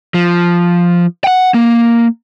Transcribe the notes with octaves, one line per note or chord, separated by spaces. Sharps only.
F3
F#5 G5
A#3